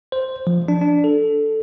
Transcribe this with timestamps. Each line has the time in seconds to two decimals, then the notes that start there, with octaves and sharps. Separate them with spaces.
0.12 C5
0.47 F3
0.68 D4
0.81 D4
1.04 A4